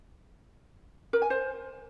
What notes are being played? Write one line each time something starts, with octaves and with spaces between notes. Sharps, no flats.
A#4
G#5
C5